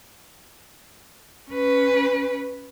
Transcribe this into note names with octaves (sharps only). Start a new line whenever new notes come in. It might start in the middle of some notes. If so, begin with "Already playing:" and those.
C#4 B4